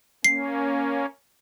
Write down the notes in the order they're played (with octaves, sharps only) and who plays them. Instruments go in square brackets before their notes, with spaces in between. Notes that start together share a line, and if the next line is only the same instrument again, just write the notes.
[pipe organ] A#3 C#4 [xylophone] C7